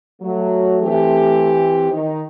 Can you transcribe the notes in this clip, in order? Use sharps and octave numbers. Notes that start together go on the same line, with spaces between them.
F#3 A3
E3 C4 G4
D#3 D#4